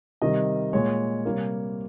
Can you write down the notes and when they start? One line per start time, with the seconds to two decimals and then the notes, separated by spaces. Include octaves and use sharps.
0.22 C3 D#3 G3 D#5
0.73 A#2 G#3 C#5
1.25 C3 G3 A#3